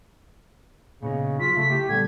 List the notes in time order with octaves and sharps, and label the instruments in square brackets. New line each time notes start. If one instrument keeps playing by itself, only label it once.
[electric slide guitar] A#2 B3 D#4 [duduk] C#3
[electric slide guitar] F#3 [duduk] F4 [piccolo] B6
[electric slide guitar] C#3 G#4 [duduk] A3
[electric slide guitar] A3 E4 [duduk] G4
[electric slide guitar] A#2 G3 B3 [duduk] D3 [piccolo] G#6